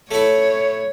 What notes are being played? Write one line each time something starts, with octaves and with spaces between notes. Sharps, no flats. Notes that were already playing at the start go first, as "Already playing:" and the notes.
A3 E4 C#5